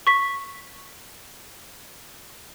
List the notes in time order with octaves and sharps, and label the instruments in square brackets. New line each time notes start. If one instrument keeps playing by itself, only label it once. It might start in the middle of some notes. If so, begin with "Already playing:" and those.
[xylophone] C#6 B6